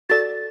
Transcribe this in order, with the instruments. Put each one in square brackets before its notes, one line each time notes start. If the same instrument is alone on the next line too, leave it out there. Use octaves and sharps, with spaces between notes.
[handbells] F#4 A4 D5 [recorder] A6